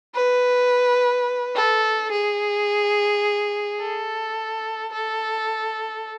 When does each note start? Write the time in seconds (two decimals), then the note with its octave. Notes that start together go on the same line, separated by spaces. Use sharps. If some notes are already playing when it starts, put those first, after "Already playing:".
0.15 B4
1.56 A4
2.12 G#4
3.81 A4
4.92 A4